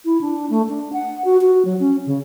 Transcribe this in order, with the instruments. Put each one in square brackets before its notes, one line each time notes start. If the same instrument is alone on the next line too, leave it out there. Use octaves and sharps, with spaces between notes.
[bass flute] E4
D4
A3
D4
F#5
F#4
F#4
F#3
C#4
C#3